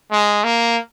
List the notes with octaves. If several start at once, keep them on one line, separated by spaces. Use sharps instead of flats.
G#3
A#3